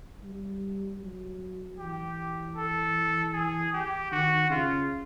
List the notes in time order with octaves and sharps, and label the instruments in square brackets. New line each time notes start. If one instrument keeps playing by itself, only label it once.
[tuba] G3
F#3
[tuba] E3 [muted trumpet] G4
[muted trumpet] A4
G#4
G4
[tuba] D#3 [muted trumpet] F#4
[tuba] C#3 [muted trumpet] F4